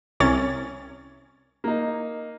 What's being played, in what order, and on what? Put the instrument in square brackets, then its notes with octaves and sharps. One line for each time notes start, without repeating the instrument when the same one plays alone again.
[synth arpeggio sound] C2 C#4 A6
[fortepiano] A#3 D#4